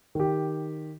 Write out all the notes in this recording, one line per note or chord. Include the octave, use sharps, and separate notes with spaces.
D#3 G4